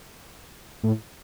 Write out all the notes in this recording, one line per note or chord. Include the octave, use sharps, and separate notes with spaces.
A2